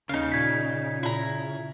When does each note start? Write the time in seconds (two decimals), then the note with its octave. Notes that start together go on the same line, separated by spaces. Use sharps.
0.09 D#2 C#3 D#4 F5
0.32 A#2 G#6 B6
1.03 A#2 E4 A#5